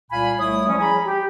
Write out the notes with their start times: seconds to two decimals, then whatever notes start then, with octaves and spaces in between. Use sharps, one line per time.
0.11 C2 A#2 F5 G#5 B5
0.38 C2 A3 E4 C#5 D#6
0.68 F3 G3 C#4
0.79 G#4 G#5 A#5 B5
1.05 G4